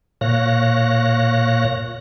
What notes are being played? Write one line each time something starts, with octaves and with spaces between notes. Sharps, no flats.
A#2 C#5 F5 F#6 A#6